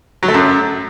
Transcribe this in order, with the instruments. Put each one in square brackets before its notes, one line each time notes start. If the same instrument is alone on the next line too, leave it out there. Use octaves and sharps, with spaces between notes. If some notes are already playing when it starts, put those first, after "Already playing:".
[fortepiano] F#3
A3
F#2